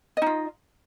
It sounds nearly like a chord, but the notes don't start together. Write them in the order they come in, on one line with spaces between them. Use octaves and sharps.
D#5 D#4 F4